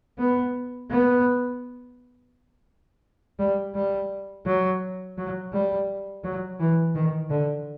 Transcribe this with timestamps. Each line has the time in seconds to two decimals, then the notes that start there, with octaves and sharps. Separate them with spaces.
0.19 B3
0.90 B3
3.39 G3
3.75 G3
4.46 F#3
5.18 F#3
5.53 G3
6.24 F#3
6.60 E3
6.95 D#3
7.30 D3